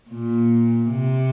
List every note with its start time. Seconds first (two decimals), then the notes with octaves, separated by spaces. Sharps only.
0.10 A#2
0.90 C3